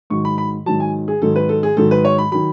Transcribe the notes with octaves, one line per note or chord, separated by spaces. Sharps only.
G#2 D#3 F#3 C#6
B5
B5
G#2 D#3 F#3 A5
G#5
G#4
G#2 D#3 F#3 A4
B4
A4
G#4
G#2 D#3 F#3 A4
B4
C#5
B5
D#3 F#3 B5